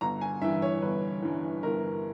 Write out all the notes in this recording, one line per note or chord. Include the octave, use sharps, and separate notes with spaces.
G1 A#5
G#5
G2 E3 E5
C#5
G1 B4
G2 E3
G1 A#4